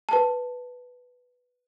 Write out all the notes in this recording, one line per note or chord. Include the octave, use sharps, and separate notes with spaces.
B4 A5